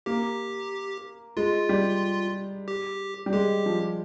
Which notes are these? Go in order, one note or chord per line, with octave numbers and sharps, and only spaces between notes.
A#3 G4
G#3 F4
G3
G4
G3
G#3 G4
F3